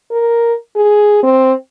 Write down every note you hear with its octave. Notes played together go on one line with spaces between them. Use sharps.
A#4
G#4
C4